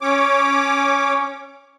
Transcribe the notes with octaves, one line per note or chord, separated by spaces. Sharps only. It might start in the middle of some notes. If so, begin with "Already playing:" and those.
C#4 C#5 D6